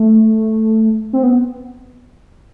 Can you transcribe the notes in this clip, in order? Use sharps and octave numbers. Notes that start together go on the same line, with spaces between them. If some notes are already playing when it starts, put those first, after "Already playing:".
Already playing: A3
C4
B3